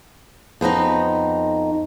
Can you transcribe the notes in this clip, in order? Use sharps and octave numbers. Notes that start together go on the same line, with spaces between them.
F2 B3 C4 D#4